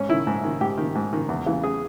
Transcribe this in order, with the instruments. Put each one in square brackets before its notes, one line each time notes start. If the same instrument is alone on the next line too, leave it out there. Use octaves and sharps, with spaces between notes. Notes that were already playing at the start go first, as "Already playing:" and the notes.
Already playing: [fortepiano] G#2 C#4
D#3 E4
G#2
D#3
G#2 G4
D#3
G#2
D#3
E2
C#3 E3
G#4